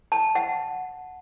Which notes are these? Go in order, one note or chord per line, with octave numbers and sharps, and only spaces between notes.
A5
F#5